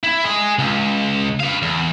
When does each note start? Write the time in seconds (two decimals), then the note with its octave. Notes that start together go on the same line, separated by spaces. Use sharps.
0.03 E4
0.24 G#4 D#5
0.58 C#2
1.40 B4 F5
1.62 E2